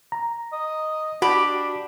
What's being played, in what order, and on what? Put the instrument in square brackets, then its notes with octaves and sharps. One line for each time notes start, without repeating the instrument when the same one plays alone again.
[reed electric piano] A#5
[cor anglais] D#5
[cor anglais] D4 [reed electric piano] F#4 [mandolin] G4 B5